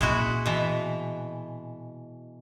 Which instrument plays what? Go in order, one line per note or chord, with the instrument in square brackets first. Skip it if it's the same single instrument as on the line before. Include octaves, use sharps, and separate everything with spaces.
[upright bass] A#2 C4 [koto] G#3 E4 F#4
[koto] B2 E3